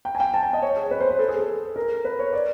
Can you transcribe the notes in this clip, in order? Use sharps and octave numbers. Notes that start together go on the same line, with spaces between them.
G5
G#5
G5
A5
G#5
D#5
C#5
G#4
B4
C5
B4
A4
G#4
A4
A#4
B4
C#5
D5